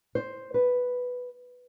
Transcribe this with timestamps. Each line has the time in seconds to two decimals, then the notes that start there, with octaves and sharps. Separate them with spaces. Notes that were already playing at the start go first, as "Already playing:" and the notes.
0.15 C5
0.54 B4